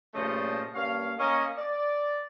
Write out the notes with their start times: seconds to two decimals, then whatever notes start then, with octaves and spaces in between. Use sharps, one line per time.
0.14 G2 A#2 C#3 F3 A3 D#5
0.74 G2 A#3 C#4 F5
1.19 A#3 C#4 D#5
1.57 D5